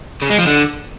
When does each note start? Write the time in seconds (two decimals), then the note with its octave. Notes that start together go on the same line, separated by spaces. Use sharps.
0.22 C#3
0.30 G#3
0.38 F3
0.47 D3